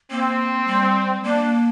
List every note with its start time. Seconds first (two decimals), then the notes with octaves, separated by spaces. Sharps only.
0.10 A#3 C4
0.67 G3
1.24 A#3 D4